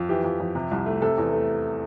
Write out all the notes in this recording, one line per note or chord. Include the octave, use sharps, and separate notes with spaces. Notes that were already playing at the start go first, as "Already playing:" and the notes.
Already playing: F2
E3 G4
F2
F2
C3
C2
A3
C3 A4
E2
A3